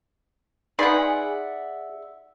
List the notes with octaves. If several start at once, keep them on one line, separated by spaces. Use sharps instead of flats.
D#4 G#4 B4 D5 E5 F#5 C6